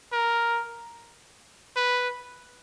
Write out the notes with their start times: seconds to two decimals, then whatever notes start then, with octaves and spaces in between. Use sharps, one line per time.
0.13 A#4
1.76 B4